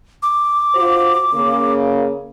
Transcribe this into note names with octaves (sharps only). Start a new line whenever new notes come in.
D6
F4 F#4 C5
C#3 A#3